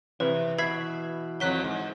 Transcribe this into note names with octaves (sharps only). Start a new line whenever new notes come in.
C3 E3 B4
B2 E5 B5 G#6 C7
F2 F#3 F#6 B6 G7
G#2